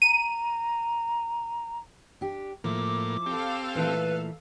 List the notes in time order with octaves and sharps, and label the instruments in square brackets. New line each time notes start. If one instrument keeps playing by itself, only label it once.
[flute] A#5 [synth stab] D#7
[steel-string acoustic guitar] D4 G4
[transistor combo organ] A2 A#3 [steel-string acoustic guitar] F3 E4 [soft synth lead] D6
[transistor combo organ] C4 G4 [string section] A4 F5
[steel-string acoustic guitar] A#2 E3 A3 [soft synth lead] B4